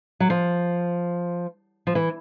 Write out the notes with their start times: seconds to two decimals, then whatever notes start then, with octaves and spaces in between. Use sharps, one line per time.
0.20 F#3
0.30 F3
1.87 F3
1.95 E3